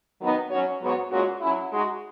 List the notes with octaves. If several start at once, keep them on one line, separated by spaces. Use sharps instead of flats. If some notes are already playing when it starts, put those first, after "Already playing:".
D#3 F#3 B3 D#4
F#3 C#4 F#4 C#5
G#2 F#3 B3 F#4 C#5
A#2 G#3 C#4 F#4
F#3 C#4 E4
G#3 D#4 F#4